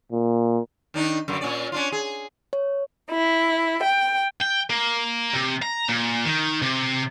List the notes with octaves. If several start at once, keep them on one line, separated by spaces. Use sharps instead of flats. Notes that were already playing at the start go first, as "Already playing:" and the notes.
A#2
D#3 D4 D#4
F#2 D3 A#3
A#2 C#4 D5
C#4 D4 F4
G#4
C#5
E4
G5
G5
A#3
C3
A#5
A#2
D#3
C3